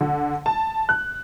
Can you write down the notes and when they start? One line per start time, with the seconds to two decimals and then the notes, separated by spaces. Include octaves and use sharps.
0.01 D3
0.46 A5
0.89 F#6